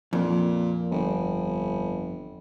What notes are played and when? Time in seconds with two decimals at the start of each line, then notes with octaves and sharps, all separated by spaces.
0.13 F2 A#2
0.91 G1